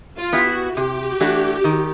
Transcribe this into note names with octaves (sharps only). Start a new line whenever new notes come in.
F4
B3 E4 G4
F#4
C3 G4
E3 A3 D4 F#4
D#3